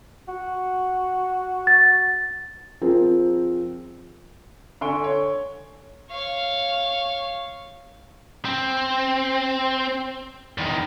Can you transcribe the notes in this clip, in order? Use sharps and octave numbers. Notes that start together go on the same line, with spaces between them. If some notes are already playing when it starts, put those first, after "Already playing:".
F#4
A6
F3 C4 G#4 A#4
D3 G#5 C6 C#6 D7 G7
C#5
C#5 F5
C4
E2 D#3